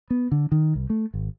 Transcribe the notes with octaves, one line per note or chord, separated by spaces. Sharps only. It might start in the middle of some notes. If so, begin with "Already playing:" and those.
B3
D3
D#3
C2
A3
G#1